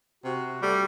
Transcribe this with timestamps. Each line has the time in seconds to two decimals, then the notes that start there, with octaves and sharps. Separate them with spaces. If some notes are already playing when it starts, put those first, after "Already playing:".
0.24 C3 F#4
0.63 G3 A3